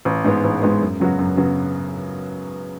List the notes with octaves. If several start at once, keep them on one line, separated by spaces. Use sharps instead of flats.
A1
G#2 G#3 B3
A1
G#2 G#3 B3
F#2
C#3 F#3 B3 F#4
F#2
C#3 F#3 B3 F#4